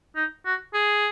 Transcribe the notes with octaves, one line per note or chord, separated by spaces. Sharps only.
D#4
F#4
G#4